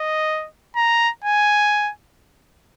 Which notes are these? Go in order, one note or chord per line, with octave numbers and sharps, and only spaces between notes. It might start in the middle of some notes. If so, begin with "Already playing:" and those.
Already playing: D#5
A#5
G#5